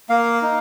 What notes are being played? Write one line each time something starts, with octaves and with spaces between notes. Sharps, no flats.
A#3 F5
D#4